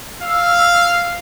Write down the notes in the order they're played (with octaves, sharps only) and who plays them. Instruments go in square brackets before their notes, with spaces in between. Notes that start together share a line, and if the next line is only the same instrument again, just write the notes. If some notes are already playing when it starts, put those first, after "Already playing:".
[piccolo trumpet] F5 [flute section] E6